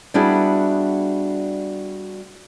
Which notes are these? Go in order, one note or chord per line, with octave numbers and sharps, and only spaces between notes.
G3 B3 D4 E4 F#4 G#4